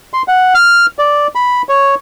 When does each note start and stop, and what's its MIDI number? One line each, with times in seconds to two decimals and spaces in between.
0.14 0.22 84
0.28 0.54 78
0.55 0.86 89
0.99 1.27 74
1.35 1.62 83
1.69 1.95 73